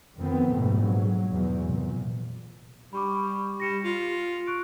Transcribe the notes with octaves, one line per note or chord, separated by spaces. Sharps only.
F2 D#3 B3 C4
A#1 G#2 B2 A3
F#3
E2 G#2 B2 F#3
F1 A#2
G3 B5 C#6 D6
G3 A#6 C#7 E7
F4
C#6 F#6 D7